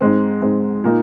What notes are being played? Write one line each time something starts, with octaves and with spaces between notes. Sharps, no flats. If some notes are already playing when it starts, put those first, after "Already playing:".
G#2 G#3 C4
G#2 G#3 C4
A#2 A#3 D#4